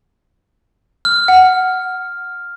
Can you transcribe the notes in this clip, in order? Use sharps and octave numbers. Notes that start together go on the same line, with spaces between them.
F6
F#5